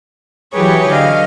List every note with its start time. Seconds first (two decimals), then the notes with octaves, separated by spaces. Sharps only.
0.53 E3 F#3 G4 G#4 B4 C#5
0.89 D3 D#5 F5